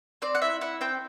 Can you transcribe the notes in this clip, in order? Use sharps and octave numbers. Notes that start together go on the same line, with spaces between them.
C4 D5
F#5
E4 E5
E4 F#5
C4 G5